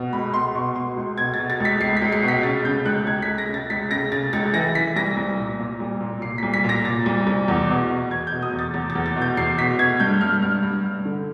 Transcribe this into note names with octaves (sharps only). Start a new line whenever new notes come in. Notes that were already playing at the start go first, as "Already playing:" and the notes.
Already playing: B2
C#2 B5
B2 C6
B2 C#6
B2 C6
C#2
B2 G#6
B2 A6
A6
C#2 B6
C#2 C7
B6
C#2
C7
B2
B6
C#3 A6
C#3 G6
C#2 F#6
C#2 G#6
B6
C#2
A#6
C#3
A6
C#2 B6
C#3 A#6
C#3 A6
C#2 A6
E3 A#6
E3 B6
C2 A#6
C2
A#2
A#2
C2
A#2
A#2 C7
C2 B6
B6
A#2
A#6
A#2 A6
C2
C2
E2
B2
B2
E2 G#6
B2 G6
D#6
E2
A6
E2 A6
A6
E2
A6
B2
G6
E2 C7
B2 B6
B2 G#6
G2 G6
G2 F6
G2 F6
G2
G2
D3